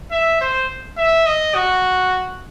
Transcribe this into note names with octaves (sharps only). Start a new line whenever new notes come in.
E5
C5
E5
D#5
F#4